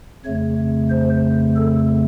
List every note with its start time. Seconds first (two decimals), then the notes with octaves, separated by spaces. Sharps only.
0.25 F2 C#3 A3 C#5
0.90 C5
1.56 A4